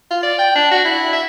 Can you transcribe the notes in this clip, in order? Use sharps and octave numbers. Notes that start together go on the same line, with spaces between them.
F4
D5
G5
D4
F#4
E4
E5